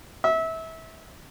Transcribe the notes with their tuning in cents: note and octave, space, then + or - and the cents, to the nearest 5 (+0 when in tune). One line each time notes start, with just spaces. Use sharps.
E5 -25